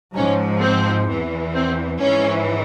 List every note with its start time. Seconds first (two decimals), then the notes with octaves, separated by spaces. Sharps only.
0.15 G#2 F3 C#4
0.61 C4
1.08 E2 E3
1.55 C4
2.00 G#2 E3 C#4